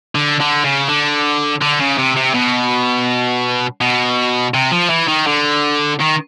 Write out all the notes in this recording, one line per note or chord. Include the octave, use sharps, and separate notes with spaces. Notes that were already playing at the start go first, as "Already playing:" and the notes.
D3
D3
C#3
D3
D3
C#3
C3
C3
B2
B2
C3
F3
E3
D#3
D3
D#3